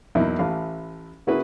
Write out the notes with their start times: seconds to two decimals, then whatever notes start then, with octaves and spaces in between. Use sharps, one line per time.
0.15 E2 F#3 A#3 D#4 E4
0.39 A1 E3 A3 F5
1.27 C#3 A#3 E4 F#4 G#4 B4